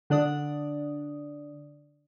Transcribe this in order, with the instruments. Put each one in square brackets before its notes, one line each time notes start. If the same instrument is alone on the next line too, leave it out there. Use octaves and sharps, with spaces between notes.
[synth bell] D3 D4 D5 D#6